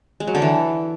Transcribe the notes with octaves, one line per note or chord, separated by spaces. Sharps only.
G#3
F#3
D3
E3